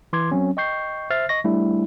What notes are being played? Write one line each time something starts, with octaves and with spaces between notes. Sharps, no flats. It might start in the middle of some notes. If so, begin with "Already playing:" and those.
E3 C6 D6 G#6
F#3 C4 C#4
D#5 G5 C#6 G6 C7
C5 E5 F6 A6 C7
D#5 C#6 A#6
G3 A3 D4 E4